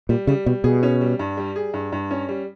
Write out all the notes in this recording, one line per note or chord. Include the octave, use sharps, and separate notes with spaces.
A#2 G3
C#3 G3
B2 G3
B2 G#4
C#4
G3
G2
G3
G#4
G2
G2
C#4
G3